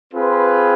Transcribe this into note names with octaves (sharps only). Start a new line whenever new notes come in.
C4 F4 G#4 B4